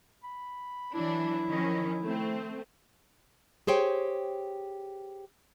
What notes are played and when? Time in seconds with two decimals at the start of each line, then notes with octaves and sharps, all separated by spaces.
0.24 B5
0.94 E3 F#3 D4 E4
1.48 D#3 F3 C#4
2.04 A3 C4
3.67 G4 G#4 C5 C#5 G5